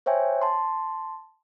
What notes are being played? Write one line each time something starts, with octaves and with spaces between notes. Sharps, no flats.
C5 C#5 E5 G5 G#5
A5 C6